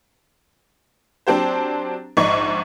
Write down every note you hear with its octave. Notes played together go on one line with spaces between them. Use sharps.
F#3 C4 D4 G4 C5
A#1 G#2 D#4 D5 C#6